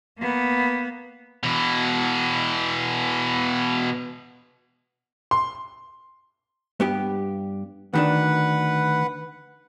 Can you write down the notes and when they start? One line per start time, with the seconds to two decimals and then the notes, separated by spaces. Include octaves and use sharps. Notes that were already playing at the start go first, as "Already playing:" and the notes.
0.19 A#3 B3
1.43 B2 E3
5.31 C6
6.80 G2 B3 G4
7.94 D2 D#3 D4 B4 F#5